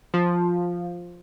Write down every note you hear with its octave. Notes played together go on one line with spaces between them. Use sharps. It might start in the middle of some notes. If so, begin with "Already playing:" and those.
F3